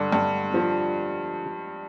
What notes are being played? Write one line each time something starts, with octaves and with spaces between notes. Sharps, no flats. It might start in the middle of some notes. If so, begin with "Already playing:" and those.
Already playing: G2 D3
G2
F3